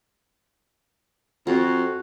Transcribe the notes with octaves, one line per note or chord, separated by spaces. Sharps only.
F2 F#4